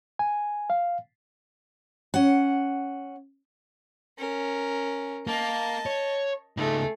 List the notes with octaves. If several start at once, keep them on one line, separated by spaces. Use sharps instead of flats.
G#5
F5
C#4 F#5
C#4 A#4
A#3 D#5 A5
C#5
C#2 A3 D#4 G#4